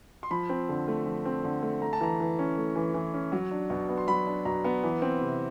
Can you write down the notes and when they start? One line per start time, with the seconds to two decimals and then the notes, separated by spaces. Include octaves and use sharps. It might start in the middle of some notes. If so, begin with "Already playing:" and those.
0.23 C6
0.31 F3 B5
0.49 C4
0.69 D3
0.88 A3
1.06 F3
1.25 C4
1.44 D3
1.62 A3
1.81 A3 A#5
1.93 A5
2.01 E3 A#5
2.20 E3
2.39 C#4
2.57 A3
2.76 E3
2.94 E3
3.14 C#4
3.32 F#3
3.51 D4
3.70 B2
3.89 B3
3.98 C6
4.07 F#3 B5
4.27 D4
4.45 B2 A#5
4.64 B3
4.84 E3
5.02 C4
5.21 C3